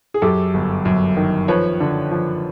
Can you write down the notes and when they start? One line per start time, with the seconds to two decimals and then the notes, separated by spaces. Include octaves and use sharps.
0.14 G#4
0.22 F#2 G4 A4
0.54 G1
0.85 F#2
1.17 D#3
1.48 F3 B4 C#5
1.80 D3
2.11 F3